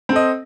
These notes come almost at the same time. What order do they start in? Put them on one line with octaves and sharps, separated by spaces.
C4 A4 D#5